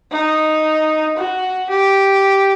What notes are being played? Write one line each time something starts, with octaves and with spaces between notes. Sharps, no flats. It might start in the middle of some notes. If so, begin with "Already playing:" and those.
D#4
F#4
G4